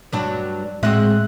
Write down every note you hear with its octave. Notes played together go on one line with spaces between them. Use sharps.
G2 F#3 D4
A2 G#3 C4 F#4 E5 F#6